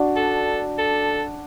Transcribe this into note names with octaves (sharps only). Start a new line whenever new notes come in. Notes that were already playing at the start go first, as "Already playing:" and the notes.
Already playing: D4 F#4
A4
A4